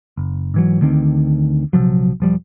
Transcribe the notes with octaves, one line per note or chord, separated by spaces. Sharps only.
F#1
G#2 E3 F#3
D2 D3 D#3 C4
A#1 C3 F3 F#3
E1 F3 G3